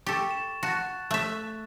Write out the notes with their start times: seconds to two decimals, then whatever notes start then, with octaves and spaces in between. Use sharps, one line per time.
0.06 G4 A4 C#6 A6
0.31 E7
0.63 F#4 A5 F#6 A6
1.11 A3 E5